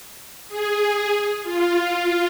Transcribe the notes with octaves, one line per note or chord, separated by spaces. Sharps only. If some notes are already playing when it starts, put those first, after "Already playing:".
G#4
F4